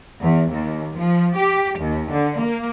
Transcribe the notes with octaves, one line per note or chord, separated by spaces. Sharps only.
E2
D#2
F3
G4
D#2
D3
A#3